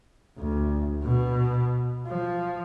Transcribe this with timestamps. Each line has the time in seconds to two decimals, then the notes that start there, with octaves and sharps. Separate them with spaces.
0.39 D2
1.03 B2
2.06 F3